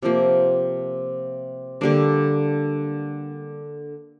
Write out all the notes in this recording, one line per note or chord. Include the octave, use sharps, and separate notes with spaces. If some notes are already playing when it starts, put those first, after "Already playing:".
C3 F3 A#3
D3 G3 A#3 D4